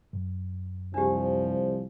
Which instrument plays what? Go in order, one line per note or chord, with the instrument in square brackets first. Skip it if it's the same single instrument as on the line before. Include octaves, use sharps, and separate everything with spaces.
[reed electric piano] F#2
[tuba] C2 [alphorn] F3 [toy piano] D4 G4